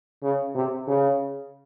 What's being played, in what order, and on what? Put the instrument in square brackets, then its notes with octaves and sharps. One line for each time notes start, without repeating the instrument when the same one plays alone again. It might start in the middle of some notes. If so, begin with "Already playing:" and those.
[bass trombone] C#3
C3
C#3